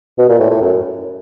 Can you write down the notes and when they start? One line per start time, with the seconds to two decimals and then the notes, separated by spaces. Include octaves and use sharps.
0.18 B2
0.29 A#2
0.39 A2
0.50 A2
0.61 F#2